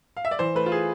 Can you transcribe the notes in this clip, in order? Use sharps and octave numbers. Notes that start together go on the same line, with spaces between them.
F5
E5
D5
E3 C5
A3 B4
F4
G#4